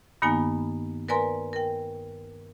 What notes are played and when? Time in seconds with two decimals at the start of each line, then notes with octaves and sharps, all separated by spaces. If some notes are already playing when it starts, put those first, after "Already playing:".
0.22 G2 D#3 A#3 B3 D#4 G#5
1.09 A#4 B4 D5 G#5 A#5 C6
1.53 A#4 G5